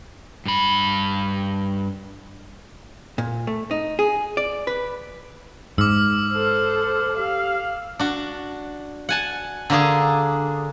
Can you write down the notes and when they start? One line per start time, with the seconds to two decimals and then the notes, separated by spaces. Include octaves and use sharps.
0.46 G2 B5
3.18 A#2
3.47 A3
3.71 D#4
3.99 G#4
4.37 D5
4.67 B4
5.78 G#2 D6 E6 F6
6.33 A4 C5
7.17 G4 F5
7.99 D4 F#4
9.09 F#5 G#5 A5
9.70 D3 A#3 D4 G#4